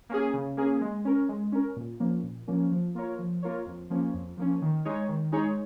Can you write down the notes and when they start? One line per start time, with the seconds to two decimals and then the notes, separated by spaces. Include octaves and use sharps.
0.09 A#3 C#4 G#4
0.33 C#3
0.57 A#3 C#4 G#4
0.81 G#3
1.05 C#4 A#4
1.29 G#3
1.52 C#4 A#4
1.76 A#2
2.00 F3 A#3 C#4
2.23 A#2
2.48 F3 A#3 C#4
2.71 F3
2.95 A#3 F4 A#4 C#5
3.19 F3
3.42 A#3 F4 A#4 C#5
3.66 F2
3.90 F3 A#3 C#4
4.14 F2
4.37 F3 A#3 C#4
4.61 D#3
4.85 G#3 D#4 G#4 C#5
5.08 D#3
5.32 G#3 D#4 G#4 C#5